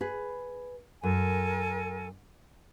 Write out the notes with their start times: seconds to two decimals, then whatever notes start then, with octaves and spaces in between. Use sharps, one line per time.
0.01 G#4 B4
1.03 F#2 A4 A#4 G#5